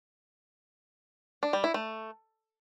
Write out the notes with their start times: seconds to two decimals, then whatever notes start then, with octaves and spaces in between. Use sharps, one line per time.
1.43 D4
1.53 G3
1.64 E4
1.74 A3